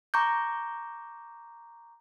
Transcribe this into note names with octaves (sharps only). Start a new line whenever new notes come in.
A#5 C#6 D6 G6